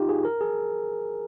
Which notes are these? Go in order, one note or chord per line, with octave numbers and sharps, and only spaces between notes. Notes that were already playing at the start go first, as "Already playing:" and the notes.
Already playing: D#4 F4 G4
G#4
A#4
G#4